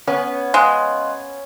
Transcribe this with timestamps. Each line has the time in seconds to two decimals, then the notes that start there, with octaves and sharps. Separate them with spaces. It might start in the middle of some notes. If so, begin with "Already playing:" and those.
0.07 B3 C#4
0.54 G#3 F5 C6 F#6